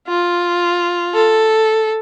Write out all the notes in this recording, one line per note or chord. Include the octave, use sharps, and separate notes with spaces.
F4
A4